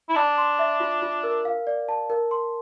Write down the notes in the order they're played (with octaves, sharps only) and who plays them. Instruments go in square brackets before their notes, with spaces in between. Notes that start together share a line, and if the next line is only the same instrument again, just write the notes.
[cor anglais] E4
[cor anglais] D4 [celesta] A5
[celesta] C6
E5
F4
F4
A#4
F5
D5
A5
A#4
C6